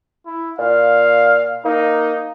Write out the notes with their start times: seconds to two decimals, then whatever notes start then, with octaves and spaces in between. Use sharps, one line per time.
0.26 E4
0.59 A#2 F5
1.65 A#3 D#4